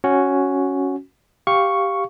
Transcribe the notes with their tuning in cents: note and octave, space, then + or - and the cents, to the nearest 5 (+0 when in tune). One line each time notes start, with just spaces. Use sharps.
C#4 +0 F#4 +0
G4 +0 F5 +0 C#6 +0